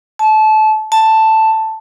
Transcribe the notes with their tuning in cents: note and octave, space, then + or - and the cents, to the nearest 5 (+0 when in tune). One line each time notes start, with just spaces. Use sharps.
A5 -25
A5 +5